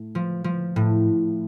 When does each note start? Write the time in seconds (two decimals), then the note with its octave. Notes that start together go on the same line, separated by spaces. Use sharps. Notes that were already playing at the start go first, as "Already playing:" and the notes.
Already playing: A2
0.15 F3
0.44 F3
0.76 A2